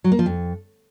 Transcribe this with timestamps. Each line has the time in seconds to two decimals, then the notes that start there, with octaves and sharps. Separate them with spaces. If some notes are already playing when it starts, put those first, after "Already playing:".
0.04 F#3
0.12 A#3
0.19 F3
0.26 F2